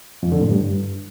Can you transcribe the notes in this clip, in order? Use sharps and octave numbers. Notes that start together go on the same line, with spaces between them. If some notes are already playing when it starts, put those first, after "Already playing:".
F2
D3
A2
G2